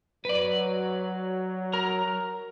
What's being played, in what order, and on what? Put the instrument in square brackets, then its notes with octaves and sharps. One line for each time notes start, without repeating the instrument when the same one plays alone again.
[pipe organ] F#3 [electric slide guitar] B4 D5
[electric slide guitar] A#4 A#5